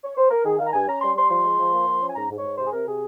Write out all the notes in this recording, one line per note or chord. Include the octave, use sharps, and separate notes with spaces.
C#5
C5
A#4
D#3 G#4
D#3 F5
A#5
G2 G#5
C#4 A#5
G3 C6
G3 C6
F3 C6
G#3
F3
A#3
F3
C#4
G#5
G#2 A#5
G#2
C#5
G#2
C3 C5
G#4
C3 A#4
C3 G#4